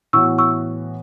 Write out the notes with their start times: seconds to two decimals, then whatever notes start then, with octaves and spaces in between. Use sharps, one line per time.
0.13 A2 E3 B3 F#4 C#6 E6
0.38 C#6 E6